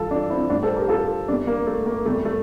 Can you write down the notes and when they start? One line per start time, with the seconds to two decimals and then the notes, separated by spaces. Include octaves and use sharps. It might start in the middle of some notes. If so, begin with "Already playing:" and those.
Already playing: G2 E3 G3 F4 A4
0.11 D4 F4
0.30 C4 E4
0.50 A2 G3 D4 F4
0.63 A4 C5
0.75 G4 A#4
0.88 F4 A4
1.28 E2 C3 G3 A#3 D4
1.47 A#3
1.67 A3
1.86 A#3
2.06 E2 C3 G3 A3
2.25 A3